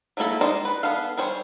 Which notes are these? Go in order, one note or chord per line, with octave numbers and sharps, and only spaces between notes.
F#3 A3 A#3 E4 A4
G#3 D#4 C5 D5 D#5
B4
B3 G#4 A4 F5
G3 G#4 C5 C#5